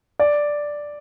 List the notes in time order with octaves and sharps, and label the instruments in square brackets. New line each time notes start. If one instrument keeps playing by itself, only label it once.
[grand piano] D5